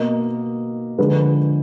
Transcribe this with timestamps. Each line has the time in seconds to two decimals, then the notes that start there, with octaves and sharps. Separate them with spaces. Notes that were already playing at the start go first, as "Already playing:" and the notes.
Already playing: B2 A#3 D#5
0.98 D3 F3 G#3 B4